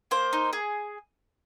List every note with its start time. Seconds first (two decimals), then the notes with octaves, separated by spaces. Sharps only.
0.11 A#3 C5
0.33 D#4
0.53 G#4